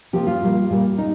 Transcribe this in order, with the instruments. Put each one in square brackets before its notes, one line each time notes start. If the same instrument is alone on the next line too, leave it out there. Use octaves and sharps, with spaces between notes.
[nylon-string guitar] C3 F3 A#3 G4
F4
A#2 G3 A#3
A#2 G3 A#3
D#4